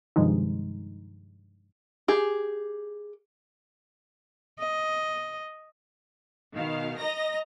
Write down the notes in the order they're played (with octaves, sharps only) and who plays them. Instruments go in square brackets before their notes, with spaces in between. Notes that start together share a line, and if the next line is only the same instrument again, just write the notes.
[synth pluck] G2 C3 D#3 F3 G#3 D#4
[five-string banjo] G4 G#4
[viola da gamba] D#5
[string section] B2 D#3 F5
D#5 A#5 A#6